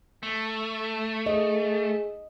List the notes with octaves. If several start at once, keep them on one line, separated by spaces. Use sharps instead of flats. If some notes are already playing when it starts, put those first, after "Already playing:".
A3
G#4 D#5